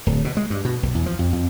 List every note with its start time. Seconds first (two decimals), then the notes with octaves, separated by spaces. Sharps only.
0.06 D1
0.25 B2
0.37 G#3
0.50 G2
0.65 B2
0.83 B1
0.95 E2
1.06 F3
1.19 F2
1.33 F2